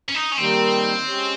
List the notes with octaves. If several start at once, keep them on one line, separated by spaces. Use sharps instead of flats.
C#4
D#4
C#4
D#3 G3 A#3 C4 D#4 G4
G#3 C#4 G4 C#5